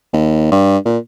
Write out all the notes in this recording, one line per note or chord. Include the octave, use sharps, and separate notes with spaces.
D#2
G2
A#2